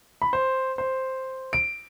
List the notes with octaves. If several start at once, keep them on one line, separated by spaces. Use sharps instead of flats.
B5
C5
C5
D7